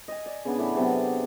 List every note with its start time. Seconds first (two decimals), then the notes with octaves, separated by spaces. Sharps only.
0.08 D#5 G#5
0.26 D5
0.45 C#3 B3 D4
0.58 A2 E3 D5 B5
0.77 C3 F#3 B3 A4